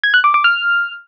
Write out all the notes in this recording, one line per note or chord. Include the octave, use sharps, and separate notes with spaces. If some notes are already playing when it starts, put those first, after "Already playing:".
G#6
F#6
D6
D6
F6